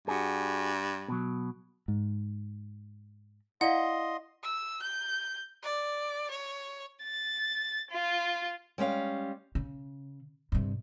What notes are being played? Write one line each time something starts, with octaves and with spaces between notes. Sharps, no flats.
G2 F#4 G#4
B2 F#3
G#2
E4 D5 D#5 F5 F#5 C6
E6
G6
D5
C#5
A6
F4
G3 G#3 C#4 F5
C#3
G2 C3